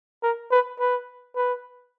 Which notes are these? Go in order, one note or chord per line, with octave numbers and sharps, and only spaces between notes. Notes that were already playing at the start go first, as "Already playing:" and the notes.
A#4
B4
B4
B4